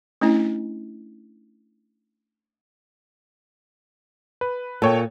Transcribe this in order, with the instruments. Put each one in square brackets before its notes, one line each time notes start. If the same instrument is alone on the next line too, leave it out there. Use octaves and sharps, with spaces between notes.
[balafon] A3 C#4 D4 E4
[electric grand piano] B4
[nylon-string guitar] A#2 [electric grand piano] A4 C#5 G5